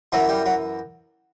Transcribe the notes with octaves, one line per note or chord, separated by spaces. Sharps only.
F#2 E3 F#3
G3
F#3